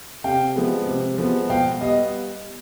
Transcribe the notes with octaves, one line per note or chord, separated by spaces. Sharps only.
C3 F5 G5
F3 G#3 B3
C3
F3 G#3 B3
B2 F5 G5
G3 B3 D#5 F5